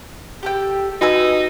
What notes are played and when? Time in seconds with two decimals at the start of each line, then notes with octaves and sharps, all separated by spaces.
0.43 G4 A4 G5
1.01 D#4 F#4 B4 G#5 E6